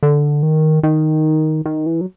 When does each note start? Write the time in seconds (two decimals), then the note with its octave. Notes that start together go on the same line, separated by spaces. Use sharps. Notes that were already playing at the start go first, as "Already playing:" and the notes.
0.03 D3
0.43 D#3
0.83 D#3
1.65 D#3
1.86 E3
2.01 F#3